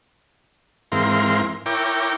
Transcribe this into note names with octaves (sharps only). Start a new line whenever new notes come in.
G#2 E3 C4 A#4 F5 C6
E4 A#4 C#5 G5 D6